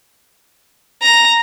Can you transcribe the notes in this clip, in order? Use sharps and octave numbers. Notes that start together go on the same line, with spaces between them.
A#5